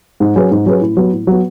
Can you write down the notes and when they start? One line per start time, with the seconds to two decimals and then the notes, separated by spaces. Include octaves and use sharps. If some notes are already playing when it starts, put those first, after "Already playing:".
0.20 G#2
0.36 F#3 C#4 G#4 B4
0.51 G#2
0.66 F#3 C#4 G#4 B4
0.81 A2
0.97 F#3 B3
1.13 A2
1.27 F#3 B3